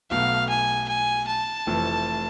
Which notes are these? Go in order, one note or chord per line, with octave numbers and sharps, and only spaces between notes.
B1 B2 A3 F5
G#5
G#5
A5
F1 F2 E3 A3